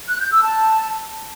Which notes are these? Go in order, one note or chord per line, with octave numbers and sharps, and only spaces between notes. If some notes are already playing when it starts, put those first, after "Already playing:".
F#6
G6
E6
A5